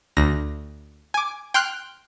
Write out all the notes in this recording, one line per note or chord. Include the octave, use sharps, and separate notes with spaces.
D2 A#6
G#5 D6
G5 C6 F6 F#6